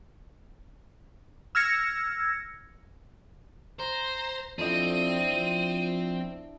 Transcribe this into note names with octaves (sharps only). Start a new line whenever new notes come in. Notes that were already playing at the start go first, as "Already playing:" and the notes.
E6 F6 G#6 A#6 C#7
C5 A#5
F2 C4 D4 E4 D#5 D#7
F3